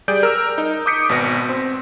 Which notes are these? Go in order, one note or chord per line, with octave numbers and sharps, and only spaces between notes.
G3 G#4 D5 G6 D7
A#4 E6
D#4
D6 D#6 G6 B6 C#7 D7
G#1 B2 B4 A#6
C4